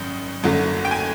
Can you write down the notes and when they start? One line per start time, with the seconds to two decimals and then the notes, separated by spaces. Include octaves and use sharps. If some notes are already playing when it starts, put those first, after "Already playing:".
Already playing: G#1 F#2 D#3
0.43 F#1 F#2 D3 F#3 A3
0.85 G5
0.91 G#5